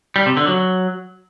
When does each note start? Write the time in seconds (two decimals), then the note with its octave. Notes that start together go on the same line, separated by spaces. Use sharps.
0.16 G3
0.26 C3
0.37 D3
0.47 F#3